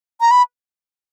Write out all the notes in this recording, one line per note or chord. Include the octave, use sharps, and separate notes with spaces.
A#5
B5